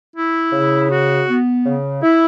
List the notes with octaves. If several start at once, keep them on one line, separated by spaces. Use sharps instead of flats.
E4
C#3
F#4
B3
C#3
E4